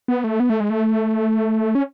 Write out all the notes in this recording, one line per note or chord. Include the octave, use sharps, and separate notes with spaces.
B3
A3
B3
A3
G#3
A3
C#4